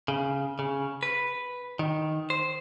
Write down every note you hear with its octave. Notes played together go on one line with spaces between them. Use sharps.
C#3
C#3
B4
D#3
C5